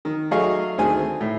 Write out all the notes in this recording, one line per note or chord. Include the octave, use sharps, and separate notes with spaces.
D#3
F#3 A3 G#4 D#5 F5 C#6
D2 D#3 C4 G#4 G#5
A2